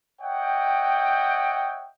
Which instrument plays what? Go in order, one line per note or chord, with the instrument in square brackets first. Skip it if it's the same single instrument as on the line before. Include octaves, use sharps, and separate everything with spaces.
[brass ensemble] C#5 D#5 E5 F#5 G5